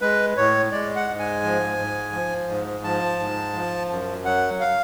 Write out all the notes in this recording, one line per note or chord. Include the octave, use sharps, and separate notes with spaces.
G#3 B4
A2 C#5
G#3 D5
F#5
G#2
G#5
F3
G#2
F3
G#2
F3 A5
G#2
F3
F#2
F#3 F#5
F5